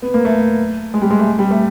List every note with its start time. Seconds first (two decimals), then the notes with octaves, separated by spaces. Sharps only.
0.02 B3
0.14 A#3
0.25 A3
0.94 G#3
1.02 G3
1.11 G#3
1.19 A3
1.39 G3
1.51 A3